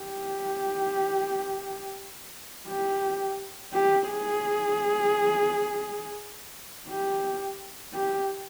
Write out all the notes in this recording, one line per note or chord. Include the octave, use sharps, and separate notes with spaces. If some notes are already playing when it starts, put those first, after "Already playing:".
Already playing: G4
G4
G4
G#4
G4
G4